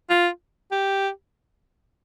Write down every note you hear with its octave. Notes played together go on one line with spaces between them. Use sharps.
F4
G4